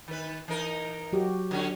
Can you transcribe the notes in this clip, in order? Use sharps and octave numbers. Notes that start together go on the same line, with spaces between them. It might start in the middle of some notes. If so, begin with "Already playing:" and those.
D#3 B4
E3 D#4 A#4
F#3 F#4 G4
D3 C#4